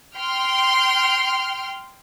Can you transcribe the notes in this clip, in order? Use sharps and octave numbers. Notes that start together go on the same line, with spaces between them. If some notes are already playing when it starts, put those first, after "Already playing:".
G5 C6 F6